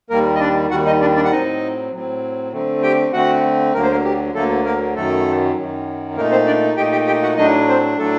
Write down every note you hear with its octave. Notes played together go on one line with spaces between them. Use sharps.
D#2 D#3 G3 A#3 A#4
D#5
D4 D5
D#2 D#3 G3 F#4 F#5
D#4 D#5
D4 D5
D4 D5
F#5
A2 F#3 C4 D#4 D#5
A2 F#3 C4
D3 A3 C4
G4 G5
D3 A3 C4 F#4 F#5
D2 D3 F#3 A#3 A#4
C5
A#3 A#4
G4
D2 D3 F#3 A3 A#3 A4
A#3 A#4
F#2 D#3 F#3 A3 A4
F#2 D#3 F#3
A#2 A3 A#3 D#4 A#4
C4 C5
D4 D5
A#2 A3 D#4 G4 G5
G4 G5
G4 G5
F#4 F#5
A2 F#3 A3 D4 D#4 D#5
C4 C5
A2 F#3 A3 D4 A4